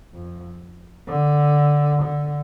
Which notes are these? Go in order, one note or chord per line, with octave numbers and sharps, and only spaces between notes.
F2
D3
D3